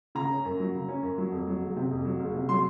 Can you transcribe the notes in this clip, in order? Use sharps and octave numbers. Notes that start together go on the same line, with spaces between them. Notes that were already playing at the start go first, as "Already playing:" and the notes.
C#3 A#5
C#4
F#2
F#3
C#3
C#4
F#2
F#3
F2
F#3
F#1
C3
F2
F#3
F#1
C3
F#3 C6